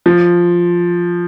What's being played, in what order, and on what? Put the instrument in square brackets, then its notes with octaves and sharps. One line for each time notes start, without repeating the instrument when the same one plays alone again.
[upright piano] F3